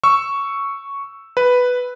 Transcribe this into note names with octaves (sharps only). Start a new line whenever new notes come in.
C#6 E6
B4